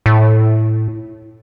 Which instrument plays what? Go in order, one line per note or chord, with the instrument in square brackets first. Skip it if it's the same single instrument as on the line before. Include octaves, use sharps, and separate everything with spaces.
[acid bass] A2